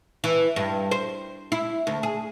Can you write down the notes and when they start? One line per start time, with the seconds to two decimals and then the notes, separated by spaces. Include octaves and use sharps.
0.24 E3
0.56 G2
0.91 C5
1.52 E4
1.87 D2
2.03 G#4